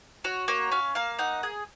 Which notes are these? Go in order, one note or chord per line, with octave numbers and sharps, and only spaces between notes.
F#4 C#5
A#3 C#5
C#4 F5
A#3 F5
D#4 F#5
G#4